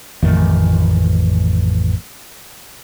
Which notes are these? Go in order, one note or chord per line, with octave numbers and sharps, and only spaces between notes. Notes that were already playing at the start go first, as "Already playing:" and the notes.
A1 F2 D#3 A3